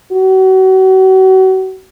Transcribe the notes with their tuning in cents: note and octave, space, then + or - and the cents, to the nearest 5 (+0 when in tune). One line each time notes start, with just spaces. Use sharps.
F#4 +35